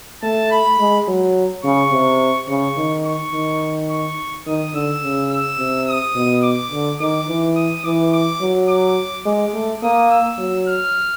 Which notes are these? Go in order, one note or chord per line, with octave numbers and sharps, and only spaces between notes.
A3 A5
B5
G#3
F#3
C#3 C#6
C3
C#3 C#6
D#3
C#6
D#3
C#6
D#3 D#6
D3 E6
C#3
E6
C3
D#6
B2
D6
D3
D#3 D6
E3
D#6
E3 D6
D6
F#3
D6
G#3 D6
A3
A#3 D#6
E6
F#3
F6